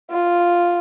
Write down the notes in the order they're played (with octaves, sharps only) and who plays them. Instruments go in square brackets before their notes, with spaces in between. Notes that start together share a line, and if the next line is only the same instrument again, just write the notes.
[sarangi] F4